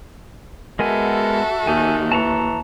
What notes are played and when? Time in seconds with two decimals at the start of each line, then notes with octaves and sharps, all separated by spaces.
0.79 G#3 B3 F#4 A4 A#4 E5 G#5
1.67 D#2 D#3 G#5
2.12 E3 A5 A#5 C#6